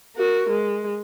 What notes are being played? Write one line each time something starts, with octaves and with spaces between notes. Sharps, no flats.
F#4 A#4
G#3